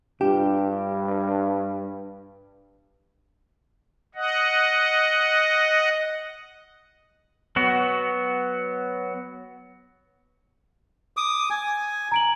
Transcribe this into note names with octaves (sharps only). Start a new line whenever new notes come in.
G2 D4 F4 G4
D#5 F#5
F#3 B3 F#4
D6 D#6
G#5
A#5 D7 F#7